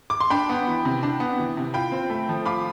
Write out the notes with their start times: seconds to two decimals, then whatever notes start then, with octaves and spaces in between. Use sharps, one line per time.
0.10 D6
0.20 C6
0.30 D4 G5 B5
0.49 B3
0.67 E3
0.85 C3
1.03 D4
1.20 B3
1.38 E3
1.57 C3
1.74 F4 G5 B5
1.92 C4
2.10 A3
2.29 F3
2.46 F4 B5 D6